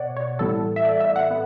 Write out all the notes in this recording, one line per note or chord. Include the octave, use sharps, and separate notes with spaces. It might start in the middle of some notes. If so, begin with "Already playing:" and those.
Already playing: B2 B3 C#5 D5 F#5
C#5
A2 E3 G3 B3 A4
E5
D5
E5
F#5
B3